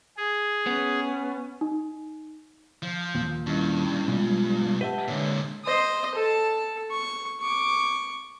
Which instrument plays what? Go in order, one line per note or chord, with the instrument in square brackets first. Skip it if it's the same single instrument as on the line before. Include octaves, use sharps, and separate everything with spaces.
[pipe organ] G#4
[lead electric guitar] B3 [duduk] C#4
[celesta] D#4
[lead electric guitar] F3
[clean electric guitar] D#2 A#2
[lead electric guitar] G2 [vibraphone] C#4 E4 D#5
[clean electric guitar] B1 [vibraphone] G#3 B3 F4
[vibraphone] G4 F#5 A5 [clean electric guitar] B4 D#5 E5
[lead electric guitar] A#2 D3 [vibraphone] G#3 C#5
[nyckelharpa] C5 D#5
A4 A5
C#6
C#6 D6